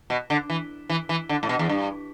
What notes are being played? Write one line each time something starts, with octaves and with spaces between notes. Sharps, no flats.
B2
D3
E3
E3
E3
D3
A2
B2
E2
G2